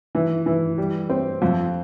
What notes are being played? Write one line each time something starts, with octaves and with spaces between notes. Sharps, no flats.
E3
E3
G3
C4
F2